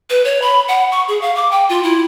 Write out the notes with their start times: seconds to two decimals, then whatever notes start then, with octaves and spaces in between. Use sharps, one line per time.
0.10 B4
0.25 C#5
0.42 B5
0.68 F#5
0.92 C#6
1.08 G#4
1.21 F5
1.36 D6
1.52 G5
1.69 F4
1.83 E4